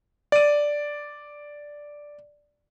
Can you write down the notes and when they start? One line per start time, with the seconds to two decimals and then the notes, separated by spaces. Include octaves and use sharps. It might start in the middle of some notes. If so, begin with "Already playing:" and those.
0.32 D5 D#7